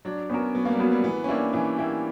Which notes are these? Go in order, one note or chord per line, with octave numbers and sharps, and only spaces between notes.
F#3 D4
B3 C#4 F#4 A#4
F#3 B3
A#3
G3
F#3 B3 F#4 A#4
G3
E3 B3
C#4
A#3 D4 E4 G4
E3 C#4
A#3 E4 G4